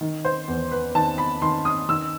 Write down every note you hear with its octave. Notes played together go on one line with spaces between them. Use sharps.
D#3
C5
E2
B4
D#3 A5
B5
D#3 C6
D#6
D#3 E6